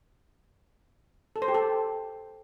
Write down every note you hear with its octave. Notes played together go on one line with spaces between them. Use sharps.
A4
C5
G4
A4